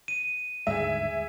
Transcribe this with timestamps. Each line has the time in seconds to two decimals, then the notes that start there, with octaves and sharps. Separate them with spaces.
0.08 D#7
0.67 G1 D#2 G#2 G#3 G#4 E5